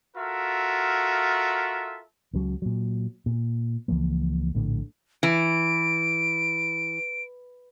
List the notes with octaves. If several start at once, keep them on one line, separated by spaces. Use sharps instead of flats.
F4 F#4 A4 A#4 E5
C#2 C#3 F#3
A#2 F#3
A#2
C#2 E3 F3 A#3
A#1 A2 D3
E3 D7